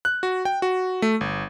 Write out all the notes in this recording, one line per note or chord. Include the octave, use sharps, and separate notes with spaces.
F#6
F#4
G5
F#4
A3
G1